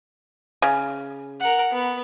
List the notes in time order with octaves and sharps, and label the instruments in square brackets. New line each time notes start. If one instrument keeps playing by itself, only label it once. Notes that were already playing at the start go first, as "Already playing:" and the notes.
[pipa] C#3
[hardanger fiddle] A#4 F#5
B3